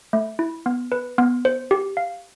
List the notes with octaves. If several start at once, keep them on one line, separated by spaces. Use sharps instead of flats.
A3
E4
B3
B4
B3
C5
G4
F5